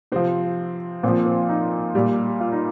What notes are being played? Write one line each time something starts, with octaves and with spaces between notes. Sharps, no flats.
C3 F3 C4
A#2 F3 C4
C4
D#4
A#2 G3
F4
D#4